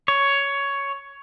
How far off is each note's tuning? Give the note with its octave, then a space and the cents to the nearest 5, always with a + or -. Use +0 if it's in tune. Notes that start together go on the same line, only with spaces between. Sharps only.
C#5 +10